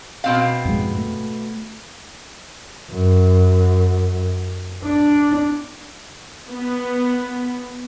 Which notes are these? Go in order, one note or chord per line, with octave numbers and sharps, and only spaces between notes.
B2 C4 F5
F2 G#2 G#3
A3
F#2
D4
B3